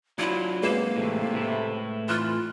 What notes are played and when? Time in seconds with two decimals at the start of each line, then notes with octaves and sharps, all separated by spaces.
0.19 F#3 D4 E4 F4
0.62 F#2 C3 G#3 A#3 B4 E7
0.96 C#2 A2 C3 E3 A3
1.33 A2 E4
2.08 F2 E3 F4 F6 F#6 E7